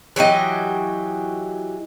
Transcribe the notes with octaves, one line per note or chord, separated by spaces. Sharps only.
E3 F#3 G4 D#5